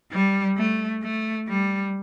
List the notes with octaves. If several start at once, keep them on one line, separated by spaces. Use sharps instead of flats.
G3
A3
A3
G3